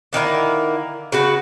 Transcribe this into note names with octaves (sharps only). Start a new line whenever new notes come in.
D3 D#3 A#3 E4
C#3 F#4 B4